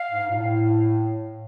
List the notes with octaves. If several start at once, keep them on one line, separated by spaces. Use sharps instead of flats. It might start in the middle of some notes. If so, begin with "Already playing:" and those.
Already playing: F5
G#2
A#2
A2